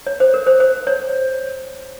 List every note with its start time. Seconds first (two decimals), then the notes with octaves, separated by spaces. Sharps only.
0.07 C#5
0.20 C5
0.34 A#4
0.46 C5
0.60 C5
0.87 C#5